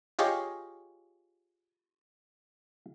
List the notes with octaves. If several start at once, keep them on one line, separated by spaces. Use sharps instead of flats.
F4 G4 G#4 C#5 D#5 F5